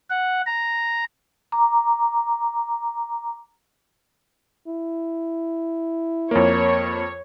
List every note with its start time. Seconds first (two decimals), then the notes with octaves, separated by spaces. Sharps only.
0.10 F#5
0.46 A#5
1.52 A#5 D6
4.68 E4
6.31 F2 A#3 C#5